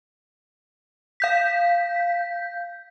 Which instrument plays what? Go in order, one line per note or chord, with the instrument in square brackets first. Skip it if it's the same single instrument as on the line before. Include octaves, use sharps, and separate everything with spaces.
[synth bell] F5 G6 B6